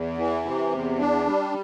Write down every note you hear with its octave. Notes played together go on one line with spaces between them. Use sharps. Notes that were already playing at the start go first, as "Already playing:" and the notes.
Already playing: E2
E3
C3
E2
D4
G3